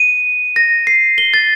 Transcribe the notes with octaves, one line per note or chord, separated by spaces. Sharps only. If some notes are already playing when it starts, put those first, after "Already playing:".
Already playing: D#7
A#6
C7
G7
A6